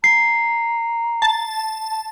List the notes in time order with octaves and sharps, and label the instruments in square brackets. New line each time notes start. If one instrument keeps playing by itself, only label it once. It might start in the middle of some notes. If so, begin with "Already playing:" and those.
[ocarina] A#5 [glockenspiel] C7
[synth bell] A5